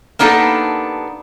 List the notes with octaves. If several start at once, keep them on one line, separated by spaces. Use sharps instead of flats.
A#3 B3 D4 D#4 G4 A4